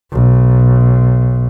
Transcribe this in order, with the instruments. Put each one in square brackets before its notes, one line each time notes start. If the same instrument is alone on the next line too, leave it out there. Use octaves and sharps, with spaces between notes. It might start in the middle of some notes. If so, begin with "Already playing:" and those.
[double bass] B1